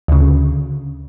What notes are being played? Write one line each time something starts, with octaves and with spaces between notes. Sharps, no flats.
D2 C#3